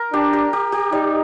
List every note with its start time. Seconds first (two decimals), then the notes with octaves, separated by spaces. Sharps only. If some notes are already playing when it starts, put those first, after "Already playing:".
Already playing: A#4
0.13 D4 G4
0.33 G4
0.53 G4
0.72 G4
0.92 G3 D#4